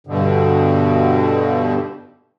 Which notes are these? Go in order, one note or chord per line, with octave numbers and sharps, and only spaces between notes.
G2 B2 D3